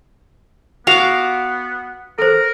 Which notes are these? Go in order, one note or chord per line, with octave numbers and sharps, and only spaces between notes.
B3 F#4 F5 D6
A4 A#4 C5